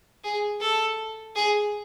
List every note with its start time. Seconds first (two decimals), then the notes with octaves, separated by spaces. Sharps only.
0.24 G#4
0.61 A4
1.36 G#4